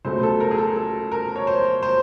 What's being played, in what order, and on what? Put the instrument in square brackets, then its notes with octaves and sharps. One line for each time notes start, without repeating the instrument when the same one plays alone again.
[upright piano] C#2 B2 F#3 A3 C5
A4
A#4
G#4
A4
A4
A#4
C#5
C5
C5